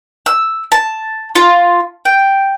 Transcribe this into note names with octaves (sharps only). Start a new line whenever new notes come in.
E6
A5
F4
G5